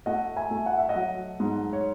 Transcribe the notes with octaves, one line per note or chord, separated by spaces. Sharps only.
A3 D#5 F#5
E5 G#5
A3
F#5
E5
D#5 F#5
F#3
G#2
C#5